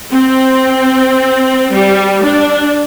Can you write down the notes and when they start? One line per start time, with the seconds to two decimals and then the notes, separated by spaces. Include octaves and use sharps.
0.11 C4
1.72 G3
2.22 D4